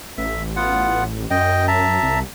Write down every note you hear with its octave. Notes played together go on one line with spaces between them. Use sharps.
A1 E5
B3 F4 F#5
F#2 D#5 G5
E5 A5 A#5
C2